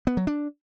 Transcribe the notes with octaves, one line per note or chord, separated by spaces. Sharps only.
B3
F#3
D4